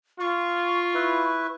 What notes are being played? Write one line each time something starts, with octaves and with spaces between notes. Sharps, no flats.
F4 C#6
E4 B4